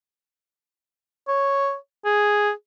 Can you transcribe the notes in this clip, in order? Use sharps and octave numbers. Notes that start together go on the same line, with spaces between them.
C#5
G#4